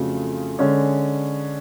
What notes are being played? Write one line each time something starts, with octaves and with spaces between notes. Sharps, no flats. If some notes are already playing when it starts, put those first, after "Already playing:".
Already playing: F2 C#3 F#3 A3 F4
D3 G#3 C#4